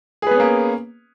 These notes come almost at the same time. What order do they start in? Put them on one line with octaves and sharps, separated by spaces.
G#4 B4 B3 C#4 A#3